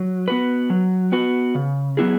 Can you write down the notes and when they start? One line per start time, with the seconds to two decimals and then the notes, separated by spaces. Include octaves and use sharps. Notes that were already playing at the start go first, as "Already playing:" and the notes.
Already playing: F#3
0.28 B3 F#4 B4
0.70 F#3
1.12 B3 F#4 B4
1.55 C#3
1.97 F#3 B3 E4 G#4